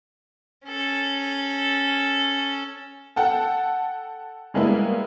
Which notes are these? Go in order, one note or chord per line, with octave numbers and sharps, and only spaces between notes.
C#4 A4
A4 F#5 G5 A5
G3 G#3 A#3 B3 E4